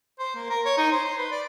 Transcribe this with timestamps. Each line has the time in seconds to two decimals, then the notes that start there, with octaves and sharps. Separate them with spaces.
0.19 C5
0.36 A#3
0.50 A#4
0.66 C#5
0.78 D#4
0.92 C5
1.05 C6
1.18 B4
1.32 D5